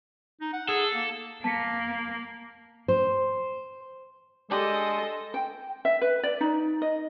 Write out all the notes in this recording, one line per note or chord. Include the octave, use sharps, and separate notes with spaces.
D#4
F#5
G#4 A4
A#3
A#3 A5 B6 C#7
C5
G#3 D4 G4 A4 D#5
G5
E5
B4
D5
D#4
D#5